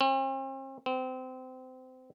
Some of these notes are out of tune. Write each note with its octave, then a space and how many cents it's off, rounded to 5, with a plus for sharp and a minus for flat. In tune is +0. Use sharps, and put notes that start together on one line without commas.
C4 +45
C4 -25